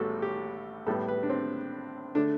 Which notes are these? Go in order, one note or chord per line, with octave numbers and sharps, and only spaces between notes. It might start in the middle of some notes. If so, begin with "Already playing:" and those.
Already playing: A1 A2 G3 B3 F#4 A4
G4
A2 G3 B3 A4
B4
D4
C4
D3 A3 D4